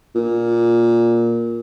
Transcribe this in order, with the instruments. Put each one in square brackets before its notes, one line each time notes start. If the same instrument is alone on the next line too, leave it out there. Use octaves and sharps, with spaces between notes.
[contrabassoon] A#2